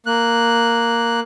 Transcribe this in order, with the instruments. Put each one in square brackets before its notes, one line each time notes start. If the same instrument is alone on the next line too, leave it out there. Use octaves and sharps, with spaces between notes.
[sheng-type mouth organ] A#3 F#6